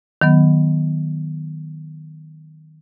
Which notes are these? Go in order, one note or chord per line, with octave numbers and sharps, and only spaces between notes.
D#3 F#3 B3